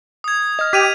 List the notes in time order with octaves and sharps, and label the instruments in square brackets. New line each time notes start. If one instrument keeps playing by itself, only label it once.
[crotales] D#6 G#6
[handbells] D#5 F6
[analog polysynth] G4 [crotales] G#6 D#7 F7 [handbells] B6